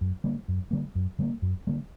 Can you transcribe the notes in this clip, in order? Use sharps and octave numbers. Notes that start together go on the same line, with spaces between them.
F#2
D3 G3 A#3
F#2
D3 G3 A#3
F#2
D3 G3 A#3
F#2
D3 G3 A#3